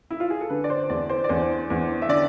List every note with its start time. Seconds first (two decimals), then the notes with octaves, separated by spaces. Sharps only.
0.11 E4
0.20 F4
0.30 G#4
0.41 A4
0.49 D3 B4
0.64 D5
0.70 C5
0.89 E2 D5
1.09 C5
1.24 D5
1.29 E2 C5
1.70 E2
2.02 E5
2.09 D3 D5